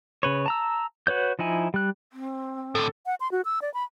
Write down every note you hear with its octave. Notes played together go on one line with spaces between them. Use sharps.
C#3 B4 C#5
A5 A#5 E6
F#4 B4 C#5 G6
F3 D#4 E4 G#5
G3 F#6
C4
A2 D3 A4
F#5
C6
F#4
E6
D5
B5